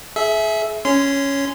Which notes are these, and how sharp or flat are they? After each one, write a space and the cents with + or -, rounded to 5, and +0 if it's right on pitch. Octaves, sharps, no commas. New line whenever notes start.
G#4 +35 E5 -5
C#4 +0 C6 -25